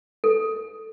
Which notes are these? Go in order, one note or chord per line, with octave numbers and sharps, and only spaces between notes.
A4